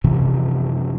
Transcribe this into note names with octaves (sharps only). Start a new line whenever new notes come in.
F#2 C3 E3 F3